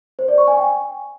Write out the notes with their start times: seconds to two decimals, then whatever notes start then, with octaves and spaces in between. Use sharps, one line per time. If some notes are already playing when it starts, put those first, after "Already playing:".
0.19 C5
0.28 D5
0.38 C#6
0.48 G#5
0.57 G5